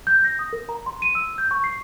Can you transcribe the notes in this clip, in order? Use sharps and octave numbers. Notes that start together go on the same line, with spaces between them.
G6
A#6
D#6
A#4
A#5
C6
D#7
E6
G6
C#6
C7